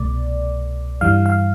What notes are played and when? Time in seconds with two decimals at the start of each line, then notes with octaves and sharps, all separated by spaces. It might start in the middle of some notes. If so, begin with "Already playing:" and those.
Already playing: C2 B2 A3 D5
1.01 G2 E3 G3 F5
1.26 F5